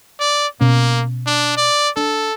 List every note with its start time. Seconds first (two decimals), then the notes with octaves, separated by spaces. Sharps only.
0.20 D5
0.61 B2 A#3 C#4
1.27 D4
1.57 D5
1.97 D4 A4